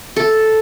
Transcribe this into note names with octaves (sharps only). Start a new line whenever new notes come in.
A4